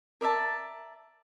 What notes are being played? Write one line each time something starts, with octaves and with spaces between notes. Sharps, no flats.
A#4 D5 E5 A5